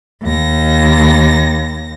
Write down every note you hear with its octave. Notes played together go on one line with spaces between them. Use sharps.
D#2 A#6